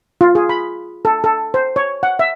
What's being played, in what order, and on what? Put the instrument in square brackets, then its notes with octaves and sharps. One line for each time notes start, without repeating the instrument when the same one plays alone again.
[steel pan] F4
G#4
B5
A4
A4
C5
C#5
F#5
E5